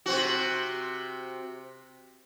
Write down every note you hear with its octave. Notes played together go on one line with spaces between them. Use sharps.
C3 C4 F#4